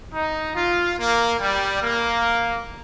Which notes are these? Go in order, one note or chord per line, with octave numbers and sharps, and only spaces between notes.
D#4
F4
A#3
G3
A#3